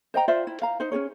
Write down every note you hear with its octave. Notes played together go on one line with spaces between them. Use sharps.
C5 D#5 G5 A#5
F4 C5 D5 E5
E4
F5 A#5
D#4 C5
C#4 D4 G#4 C#5